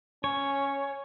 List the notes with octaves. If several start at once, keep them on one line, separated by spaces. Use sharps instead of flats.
C#4 C#5